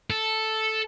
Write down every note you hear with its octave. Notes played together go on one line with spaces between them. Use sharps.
A4